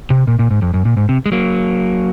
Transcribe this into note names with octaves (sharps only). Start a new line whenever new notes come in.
C3
A#2
A#2
G#2
F2
F#2
A#2
G#2
C3
G#3
F#3 A#3